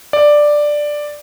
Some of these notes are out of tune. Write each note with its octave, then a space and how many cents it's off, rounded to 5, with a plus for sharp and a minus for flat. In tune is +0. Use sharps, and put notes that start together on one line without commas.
D5 +5